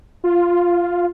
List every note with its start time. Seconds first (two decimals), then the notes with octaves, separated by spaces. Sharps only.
0.24 F4